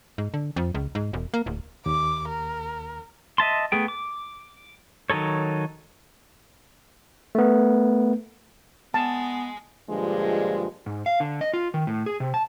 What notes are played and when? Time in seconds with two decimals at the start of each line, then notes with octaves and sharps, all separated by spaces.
0.18 G#2
0.34 D3
0.56 F2
0.75 C#2
0.95 G#2
1.13 E1
1.34 A#3
1.46 D1
1.86 D#2 D6
2.28 A#4
3.38 D#5 E5 A5 C6
3.72 A3 B3 G#4 G5
3.88 D6
5.10 D#3 F#3 D#4 A4 C#5
7.35 A3 B3
8.94 G#3 B3 A5
9.89 G2 A#2 D3 F3 G#3
10.86 G#2
11.06 F5
11.20 D3
11.41 D#5
11.53 F4
11.74 D#3
11.87 A2
12.06 G#4
12.20 C3
12.34 A5